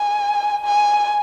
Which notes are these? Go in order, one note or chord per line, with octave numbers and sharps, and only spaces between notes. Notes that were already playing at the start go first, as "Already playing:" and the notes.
Already playing: G#5
G#5